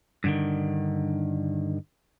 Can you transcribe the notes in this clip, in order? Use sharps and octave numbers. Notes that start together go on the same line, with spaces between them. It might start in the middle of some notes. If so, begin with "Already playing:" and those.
G2 D3 D#3